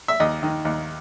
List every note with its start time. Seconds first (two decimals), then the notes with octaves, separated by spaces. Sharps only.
0.08 E5
0.20 D#2 D#5
0.43 D#3
0.65 D#2